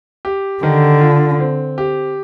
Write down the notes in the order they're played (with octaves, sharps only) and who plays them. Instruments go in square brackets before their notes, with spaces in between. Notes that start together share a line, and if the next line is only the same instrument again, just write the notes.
[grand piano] G4
[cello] D3 [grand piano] D#3
[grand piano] F4
C4
G4